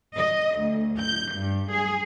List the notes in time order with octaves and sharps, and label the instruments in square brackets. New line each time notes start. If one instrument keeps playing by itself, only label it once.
[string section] D#5
D2
G6
G2
G#4